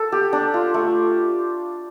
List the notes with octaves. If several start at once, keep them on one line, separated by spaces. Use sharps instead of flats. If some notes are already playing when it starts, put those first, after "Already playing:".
Already playing: A4
G4
D4
F4
A3